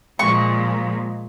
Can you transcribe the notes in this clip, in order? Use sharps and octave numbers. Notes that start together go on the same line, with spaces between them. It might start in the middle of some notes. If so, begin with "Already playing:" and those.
A#2 F3 G#3 C#6